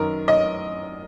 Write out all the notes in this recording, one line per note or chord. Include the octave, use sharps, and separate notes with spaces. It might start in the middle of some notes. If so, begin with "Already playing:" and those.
Already playing: F#2 D#3 A#4
D#5